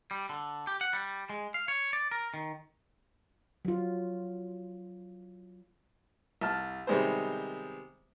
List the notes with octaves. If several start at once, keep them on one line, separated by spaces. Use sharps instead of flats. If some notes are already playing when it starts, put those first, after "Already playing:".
G3
D3
G4
F#5
G3
G#3
F5
C#5
D5
A#4
D#3
F#3 F4
C2 A5 F6
C3 D#3 G3 G#3 B3 C5